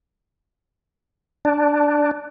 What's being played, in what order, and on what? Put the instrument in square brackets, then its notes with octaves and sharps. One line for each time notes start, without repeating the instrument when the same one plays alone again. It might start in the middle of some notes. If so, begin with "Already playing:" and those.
[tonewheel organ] D4